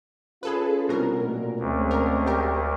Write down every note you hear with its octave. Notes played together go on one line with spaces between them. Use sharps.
C#4 F4 G#4 A4 B4
C2 B2 A#4
A#2 F#3 A3 F#4
D2 G#3 C4 C#4
A#4
G4 A#4